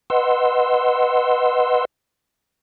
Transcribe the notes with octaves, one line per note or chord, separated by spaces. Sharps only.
B4 D#5 F#5 C6 E6